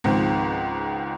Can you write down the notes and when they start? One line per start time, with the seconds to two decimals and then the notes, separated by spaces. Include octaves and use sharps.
0.04 C#2 G#2 D#3 F3 C4